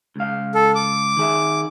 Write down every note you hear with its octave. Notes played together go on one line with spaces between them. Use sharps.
C#2 F5
A4
D6
D#3 G#4 E5